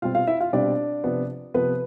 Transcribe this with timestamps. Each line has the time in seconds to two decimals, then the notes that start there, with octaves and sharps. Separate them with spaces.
0.02 B2 G3 C4 F4 F5
0.15 F4 F5
0.27 E4 E5
0.40 F4 F5
0.53 B2 G3 C4 D4 D5
1.04 C3 F3 B3
1.54 C3 F3 B3 B4